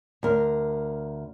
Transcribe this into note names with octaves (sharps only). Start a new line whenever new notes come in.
D2 A#4